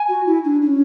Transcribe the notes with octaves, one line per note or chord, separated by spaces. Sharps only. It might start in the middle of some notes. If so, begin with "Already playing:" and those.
Already playing: G#5
F#4
E4
D4
D4
C#4